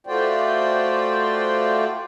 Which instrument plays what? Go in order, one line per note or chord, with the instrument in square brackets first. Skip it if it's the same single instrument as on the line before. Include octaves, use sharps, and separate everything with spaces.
[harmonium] A3 F4 F#4 C5 D5 G5